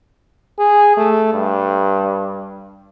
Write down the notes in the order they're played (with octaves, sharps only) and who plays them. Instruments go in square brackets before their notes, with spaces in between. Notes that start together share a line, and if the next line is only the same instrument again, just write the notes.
[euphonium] G#4
A3
G2